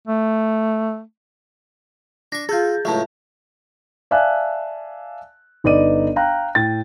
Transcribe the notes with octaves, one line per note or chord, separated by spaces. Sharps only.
A3
D4 C#6 A#6
F4 G#4 A4 G6
C#2 A2 F#3 E5 A5
D5 E5 F5 G#5 A5 F#6
G1 D#4 B4 D5 D#5 D#7
F5 G5 A#5 F#6
A2 G5 A6